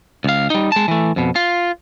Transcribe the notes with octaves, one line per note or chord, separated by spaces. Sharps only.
C#2 F5
G3 D#4
G#3 A5
E3 A3
F2 B2
F4